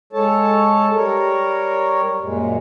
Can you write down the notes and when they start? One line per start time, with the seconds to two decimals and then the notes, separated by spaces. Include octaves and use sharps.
0.13 G#3 A4 C#5 A5
0.94 G3 A#4 C#5
2.21 F#2 A#2 G#3